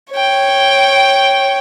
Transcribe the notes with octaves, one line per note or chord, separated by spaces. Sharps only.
C#5 G5